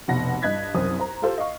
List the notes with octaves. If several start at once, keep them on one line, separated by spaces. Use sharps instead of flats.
F1 B2 F#5 A#6
G2 D#5 F#6 G#6 B6
C2 F#2 C4 D#6
C5 A#5
F4 G4 A4 C5
D#5 F5 C#6